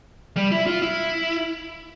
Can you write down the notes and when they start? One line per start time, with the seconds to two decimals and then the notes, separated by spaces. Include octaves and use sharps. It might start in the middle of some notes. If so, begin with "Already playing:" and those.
0.37 G3
0.52 E4
0.66 F4
0.82 E4